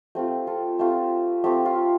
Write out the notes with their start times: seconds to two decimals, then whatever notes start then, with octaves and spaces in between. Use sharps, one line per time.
0.15 A3 C4 F4 G4
0.47 F4 A4
0.79 A3 C4 F4 G4
1.44 A3 C4 F4 G4
1.65 F4